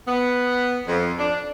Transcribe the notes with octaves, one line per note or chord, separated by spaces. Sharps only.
B3
F2
D4